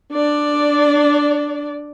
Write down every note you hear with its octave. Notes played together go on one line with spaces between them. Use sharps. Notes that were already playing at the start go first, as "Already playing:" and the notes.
D4 D5